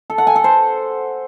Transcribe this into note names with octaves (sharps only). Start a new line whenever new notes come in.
A4
F#5
G#5
A4
C5